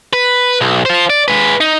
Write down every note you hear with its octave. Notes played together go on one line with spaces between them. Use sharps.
B4
B1
F4 C5
D5
G#3 B4
D#4